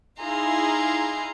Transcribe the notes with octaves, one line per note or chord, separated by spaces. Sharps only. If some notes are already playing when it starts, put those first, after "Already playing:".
D#4 E4 G#4 F5 A#5 C6